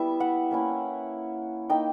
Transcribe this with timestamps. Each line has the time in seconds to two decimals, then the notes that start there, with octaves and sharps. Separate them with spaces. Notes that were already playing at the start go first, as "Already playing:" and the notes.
Already playing: G3 B3 E4 E5
0.20 F#5
0.51 A#3 C#4 E4
1.70 A#3 D#4 G5